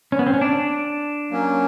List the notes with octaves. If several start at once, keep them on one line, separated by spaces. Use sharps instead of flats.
C#4
B3
C4
C#4
D4
F#3 A#3 C#4